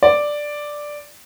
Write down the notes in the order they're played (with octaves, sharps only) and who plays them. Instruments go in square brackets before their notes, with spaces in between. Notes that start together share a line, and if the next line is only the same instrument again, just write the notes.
[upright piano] D5